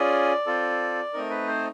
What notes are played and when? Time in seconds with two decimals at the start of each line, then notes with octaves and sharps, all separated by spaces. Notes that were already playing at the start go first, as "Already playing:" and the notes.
Already playing: C#4 F4 G#4 D5
0.46 C4 F4 A4
1.14 A3 C4 D#4 A#4
1.30 B4
1.47 C5